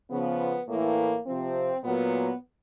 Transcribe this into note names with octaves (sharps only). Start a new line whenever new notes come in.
C#3 F3 B3
A2 E3 A#3
C3 F3 C4
A#2 F#3 B3